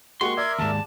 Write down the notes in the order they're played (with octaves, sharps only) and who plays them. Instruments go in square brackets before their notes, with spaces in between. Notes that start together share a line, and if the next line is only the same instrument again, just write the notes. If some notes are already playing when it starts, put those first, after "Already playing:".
[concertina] G#3 [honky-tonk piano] A#3 F#4 G4 [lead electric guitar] C6 [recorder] C#6
[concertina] A#4 E5 [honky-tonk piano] D5 [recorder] G#6
[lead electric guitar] D#2 G#2 [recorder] A5